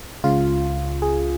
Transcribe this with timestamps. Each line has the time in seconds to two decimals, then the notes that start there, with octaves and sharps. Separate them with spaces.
0.24 C#2 C#3 F4
1.02 G#4